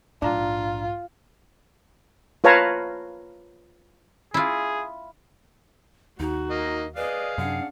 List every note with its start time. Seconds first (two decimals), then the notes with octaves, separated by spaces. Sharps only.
0.22 A#1 G#2 D4 F4 A#5
2.44 F4 B4 C#5 F5 A5 A#5
4.34 E4 F4 G#4
6.20 D#2 D#4 F#4
6.50 A#3 D#5
6.96 G#4 B4 D5 D#5 F5
7.38 F#2 C3 C#4 D4 F#5